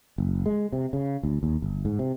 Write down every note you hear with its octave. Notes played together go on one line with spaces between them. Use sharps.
F#1
G#3
C3
C#3
D2
D#2
G1
G#2
C3